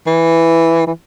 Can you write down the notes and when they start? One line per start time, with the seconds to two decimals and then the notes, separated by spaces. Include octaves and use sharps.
0.07 E3
0.87 E3